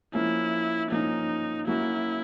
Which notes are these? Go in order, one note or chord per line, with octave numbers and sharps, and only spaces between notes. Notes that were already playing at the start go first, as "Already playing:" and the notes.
F3 A#3 C#4 E4
F3 A#3 C#4 D#4
F#3 A#3 C#4 E4 F#4